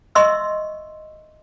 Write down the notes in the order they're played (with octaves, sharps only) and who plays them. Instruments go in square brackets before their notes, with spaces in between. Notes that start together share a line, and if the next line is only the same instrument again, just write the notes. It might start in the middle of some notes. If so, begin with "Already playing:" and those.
[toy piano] D#5 E5 C6 C#6 E6